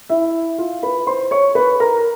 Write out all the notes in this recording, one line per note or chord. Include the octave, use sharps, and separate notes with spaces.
E4 E5
F4 F5
B4 B5
C5 C6
C#5 C#6
B4 B5
A#4 A#5